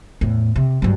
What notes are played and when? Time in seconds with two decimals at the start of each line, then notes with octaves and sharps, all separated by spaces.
0.21 E2 A2
0.56 C3
0.82 G2 F#3